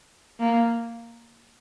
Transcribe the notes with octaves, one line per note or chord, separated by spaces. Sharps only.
A#3